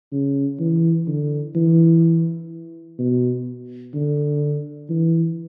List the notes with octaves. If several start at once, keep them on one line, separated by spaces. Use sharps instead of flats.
C#3
E3
D3
E3
B2
D3
E3